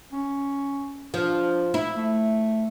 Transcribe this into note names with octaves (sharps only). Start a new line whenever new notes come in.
C#4
F3 D4
E4
A3